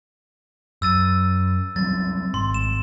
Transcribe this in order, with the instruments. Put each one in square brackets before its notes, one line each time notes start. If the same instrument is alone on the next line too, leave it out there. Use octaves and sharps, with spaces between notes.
[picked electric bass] F#2 [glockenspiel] E6 A6 D#7
[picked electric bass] F#3 G3 C4 [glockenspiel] A6
[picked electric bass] G#1 [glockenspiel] C6
[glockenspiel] E7